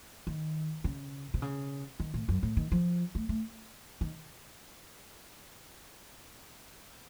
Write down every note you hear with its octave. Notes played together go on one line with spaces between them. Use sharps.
D#3
C#3
C3
C#3
D#3
A2
F#2
A2
D#3
F3
A3
A3
D#3